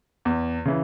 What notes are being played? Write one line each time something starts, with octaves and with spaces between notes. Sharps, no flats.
E2
C#3 E3